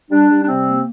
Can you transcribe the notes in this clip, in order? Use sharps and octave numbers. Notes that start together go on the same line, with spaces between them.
G3 D4
G3
D4
C3 C4
A#3